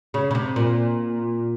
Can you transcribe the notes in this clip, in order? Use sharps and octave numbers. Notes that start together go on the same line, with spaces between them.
C#3
C#3
C3
A#2